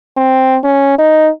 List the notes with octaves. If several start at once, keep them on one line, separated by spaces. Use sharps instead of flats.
C4
C#4
D#4